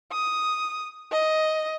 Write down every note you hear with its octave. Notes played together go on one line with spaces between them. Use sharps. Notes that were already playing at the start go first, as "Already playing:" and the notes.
D#6
D#5